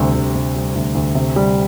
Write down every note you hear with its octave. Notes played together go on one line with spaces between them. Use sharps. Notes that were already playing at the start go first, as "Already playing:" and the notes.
Already playing: D2 C3 G3
D2
C3
G3
D2
D2
C3
G3